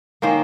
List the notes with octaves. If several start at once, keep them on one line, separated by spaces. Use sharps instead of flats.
D#3 A#3 C#4 C5